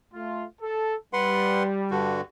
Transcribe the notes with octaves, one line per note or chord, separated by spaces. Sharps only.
A3 F4
A4
G3 B4 F#5 C6
G2 D3 F#4